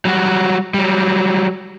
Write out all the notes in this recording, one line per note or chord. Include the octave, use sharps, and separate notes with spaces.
F#3 G3 F#4
F#3 G3